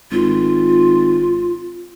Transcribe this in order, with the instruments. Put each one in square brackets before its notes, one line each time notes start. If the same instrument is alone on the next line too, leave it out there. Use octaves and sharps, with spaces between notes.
[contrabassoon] G#1 [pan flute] F4